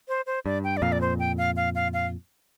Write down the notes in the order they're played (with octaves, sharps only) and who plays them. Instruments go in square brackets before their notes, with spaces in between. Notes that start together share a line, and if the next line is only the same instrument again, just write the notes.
[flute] C5
C5
[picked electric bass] G2 [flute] D5
[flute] G5
D5
[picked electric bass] F2 A#2 [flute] F5
[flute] D5
C5
G5
F5
F5
F5
F5